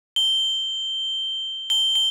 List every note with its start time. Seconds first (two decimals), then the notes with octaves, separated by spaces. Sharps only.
0.16 G7
1.70 G7
1.95 G7